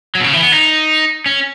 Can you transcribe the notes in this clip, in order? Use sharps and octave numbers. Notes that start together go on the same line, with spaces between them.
F#3
B2
C#3
E3
B3
D#4
C#4